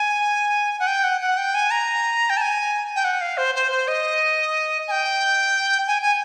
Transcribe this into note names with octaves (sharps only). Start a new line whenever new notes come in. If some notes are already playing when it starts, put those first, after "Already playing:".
Already playing: G#5
F#5
G5
F#5
F#5
G5
G#5
A#5
G5
A5
G#5
G5
F#5
F5
C5
C5
C5
D#5
G#5
G5
G#5
G#5